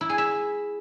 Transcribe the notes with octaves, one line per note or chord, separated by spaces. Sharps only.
E4
G#4
E5